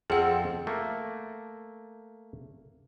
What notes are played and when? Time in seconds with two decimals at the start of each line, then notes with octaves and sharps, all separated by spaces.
0.10 F2 C4 G#4 A4 F#5
0.67 A3 A#3